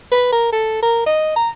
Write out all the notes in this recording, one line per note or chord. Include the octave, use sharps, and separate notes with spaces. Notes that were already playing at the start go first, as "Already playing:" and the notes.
B4
A#4
A4
A#4
D#5
A#5